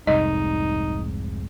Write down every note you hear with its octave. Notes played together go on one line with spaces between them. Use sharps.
F1 C2 G#2 D#4 D#5